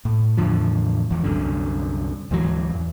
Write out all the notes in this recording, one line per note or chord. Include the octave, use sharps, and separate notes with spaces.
A2
E2 A2 D3 F3
G#1 E2
C2 F#2 D3
D2 G#2 E3 F#3
E2